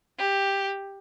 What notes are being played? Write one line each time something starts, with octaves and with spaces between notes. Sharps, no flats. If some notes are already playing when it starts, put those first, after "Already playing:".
G4